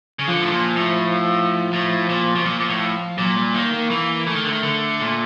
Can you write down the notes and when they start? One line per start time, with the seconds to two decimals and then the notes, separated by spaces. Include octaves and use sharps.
0.19 C#3
0.27 D3 F3
0.41 A2
0.52 A#2
0.76 A2
1.73 A2
2.09 A#2
2.35 B2
2.45 A#2 F3
2.60 A#2
2.69 A2
3.18 A#2 F#3
3.36 G3
3.54 D#3 A#3
3.72 A#3
3.90 E3 A#3
4.27 E3 A3
4.35 D#3
4.45 D3
4.52 D#3
4.63 D3
5.00 A#2